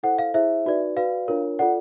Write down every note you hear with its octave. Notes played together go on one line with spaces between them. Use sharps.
E4 A4 C5 F#5
F5
E4 G#4 C5 E5
D#4 F#4 B4 D5
F#4 B4 D5 F5
D4 F4 A#4 C#5
F4 A4 D5 F#5